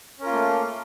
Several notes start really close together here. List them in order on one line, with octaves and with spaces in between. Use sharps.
C#4 A#4 F4 A#3 A3